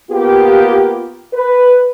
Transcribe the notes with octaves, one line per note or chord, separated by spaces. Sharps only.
A#3 B3 F4 G4
B4